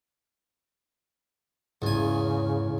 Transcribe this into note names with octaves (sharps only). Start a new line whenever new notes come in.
E2 G#2 C#3 G#5